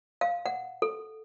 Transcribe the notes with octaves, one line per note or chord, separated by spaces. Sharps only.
F5
F#5
A4